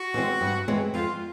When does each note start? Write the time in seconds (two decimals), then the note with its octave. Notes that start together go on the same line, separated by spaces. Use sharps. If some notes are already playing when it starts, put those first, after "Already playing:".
Already playing: F#4
0.14 E3 G#3 C4
0.41 G2
0.68 E3 G#3 C4
0.94 F2 F4